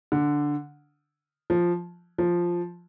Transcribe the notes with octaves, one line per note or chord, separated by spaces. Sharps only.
D3
F3
F3